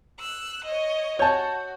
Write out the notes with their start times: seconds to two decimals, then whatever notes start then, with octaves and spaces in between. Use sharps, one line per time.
0.20 E6 F#6
0.65 C#5 D#5
1.19 F#4 C#5 A5 G6